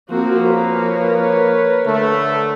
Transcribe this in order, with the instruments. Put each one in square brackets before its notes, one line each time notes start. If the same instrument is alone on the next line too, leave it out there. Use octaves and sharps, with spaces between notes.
[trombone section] F3 A#3 [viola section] C4 F#4
[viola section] A#4 B4 C#5
[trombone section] D3 A3